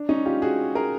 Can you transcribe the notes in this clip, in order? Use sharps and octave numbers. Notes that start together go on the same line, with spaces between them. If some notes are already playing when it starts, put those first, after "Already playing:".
Already playing: D4
C#4 D#4
F4 G4
F#4 G#4
G#4 A#4